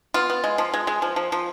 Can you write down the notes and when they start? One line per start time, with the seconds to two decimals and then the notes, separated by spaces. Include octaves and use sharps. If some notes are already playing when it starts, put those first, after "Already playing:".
0.14 B3 F4
0.30 B3
0.44 G#3
0.58 F3
0.74 G#3
0.87 G#3
1.02 F3
1.16 F3
1.32 F3